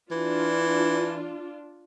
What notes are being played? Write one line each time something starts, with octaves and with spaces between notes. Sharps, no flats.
E3 D4 F4